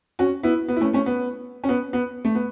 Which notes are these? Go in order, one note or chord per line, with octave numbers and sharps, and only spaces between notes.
C#4 F#4
B3 E4
B3
E4
A3 C#4
A3 C#4
B3
C#4
B3
B3
A3
B3